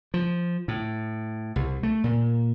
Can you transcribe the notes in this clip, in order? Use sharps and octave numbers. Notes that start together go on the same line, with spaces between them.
F3
A2
C2
A3
A#2